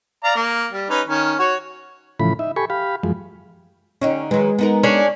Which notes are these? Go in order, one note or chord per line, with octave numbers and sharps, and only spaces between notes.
D5 F5 A#5
A#3
G3
C#4 D#4 B4
D#3 C#4
F#4 C#5
A2 C#3 E3 F3 B5
D#4 E5
G4 A4 G#5 B5 C#6
G4 F5 B5
F#2 F3 G#3
D3 C#4 D#4 G4
D#3 F#3 G#3 B4
B3 D#4 A#4
C#4 D4 G#4